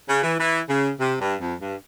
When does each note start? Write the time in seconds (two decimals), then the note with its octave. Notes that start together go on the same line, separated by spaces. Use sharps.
0.09 C#3
0.23 E3
0.39 E3
0.69 C#3
1.00 C3
1.20 G2
1.40 F2
1.61 G2